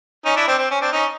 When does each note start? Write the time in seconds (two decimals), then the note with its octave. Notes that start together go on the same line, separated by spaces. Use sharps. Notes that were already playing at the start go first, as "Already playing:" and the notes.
0.25 C#4 D#4
0.36 D4 E4
0.47 C4 D4
0.58 C4
0.71 C#4
0.81 C4 D4
0.92 C#4 D#4